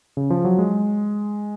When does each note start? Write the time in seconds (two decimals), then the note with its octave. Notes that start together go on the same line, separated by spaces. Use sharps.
0.17 C#3
0.30 F3
0.45 F#3
0.59 G#3